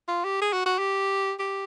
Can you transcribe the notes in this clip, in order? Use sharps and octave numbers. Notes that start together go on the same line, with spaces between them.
F4
G4
G#4
F#4
F#4
G4
G4